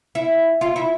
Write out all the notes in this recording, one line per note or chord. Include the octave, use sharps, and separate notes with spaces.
E4
F4
E4